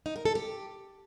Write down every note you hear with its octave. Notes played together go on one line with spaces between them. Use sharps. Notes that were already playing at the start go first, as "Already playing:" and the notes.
D#4
A#4
A4
G4